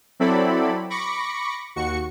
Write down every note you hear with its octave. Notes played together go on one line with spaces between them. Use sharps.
F#3 C4 E4 A4 D5 B5
B5 C#6 D6 A#6 C#7
D#2 F#4 C#6 C#7